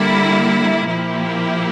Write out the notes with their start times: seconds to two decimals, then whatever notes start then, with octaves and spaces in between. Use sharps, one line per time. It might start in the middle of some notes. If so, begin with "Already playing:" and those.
Already playing: D3 G3 A#3 E4
0.88 A#2 F3 A#3 E4 G4